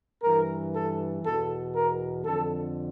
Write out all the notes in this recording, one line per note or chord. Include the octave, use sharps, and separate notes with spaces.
G2 E3 A#4
A4
E2 B2 A4
A#4
F2 D3 A4